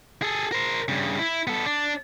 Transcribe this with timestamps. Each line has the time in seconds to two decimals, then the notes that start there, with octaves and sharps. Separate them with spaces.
0.22 G#4 A4
0.52 A#4 C5
0.88 G2 C#3
1.19 E4
1.47 B3 A4
1.66 D4